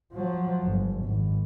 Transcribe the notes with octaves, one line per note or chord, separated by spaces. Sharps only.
F3 F#3
G1
G#1